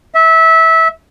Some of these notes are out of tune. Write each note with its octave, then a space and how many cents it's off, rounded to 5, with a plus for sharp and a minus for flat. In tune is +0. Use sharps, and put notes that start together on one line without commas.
E5 -20